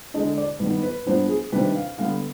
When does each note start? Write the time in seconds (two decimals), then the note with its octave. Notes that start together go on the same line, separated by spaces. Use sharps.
0.14 D3 G#3 D4 D#5
0.37 D5
0.60 G2 D#3 B3 B4
0.83 B4
1.06 G2 F3 B3 D4 C5
1.29 G#4
1.52 C3 D#3 G3 D4 B4
1.76 F5
1.98 D3 G3 B3 F5